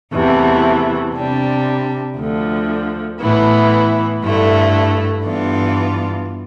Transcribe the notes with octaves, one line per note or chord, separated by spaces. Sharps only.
E2 C3 E3 A3
C3 G3 D4
D2 D3 F3
A2 E3 B3 E4
G2 D3 A3 E4
G2 E3 B3 D4 F4